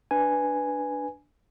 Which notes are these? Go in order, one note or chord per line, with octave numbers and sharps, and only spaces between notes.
D4 B4 G#5